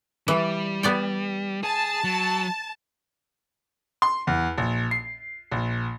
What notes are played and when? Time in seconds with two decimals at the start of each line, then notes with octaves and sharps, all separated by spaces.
0.28 E3 G3
0.83 B3 D5 G5
1.63 G#4 A5
2.04 F#3
4.02 C6
4.27 E2
4.58 A#1
4.91 C7
5.51 A#1